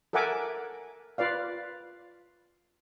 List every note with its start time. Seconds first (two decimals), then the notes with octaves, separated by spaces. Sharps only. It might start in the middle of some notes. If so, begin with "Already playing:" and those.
0.13 A4 A#4 E5 F#5 G#5 D6
1.18 F4 B4 D5 F5